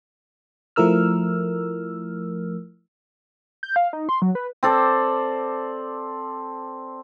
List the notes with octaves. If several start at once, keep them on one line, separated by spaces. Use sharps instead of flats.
F3 A3 E4 A#4 E6 F6
G6
F5
D#4
C6
F#3
B4
C4 A4 D5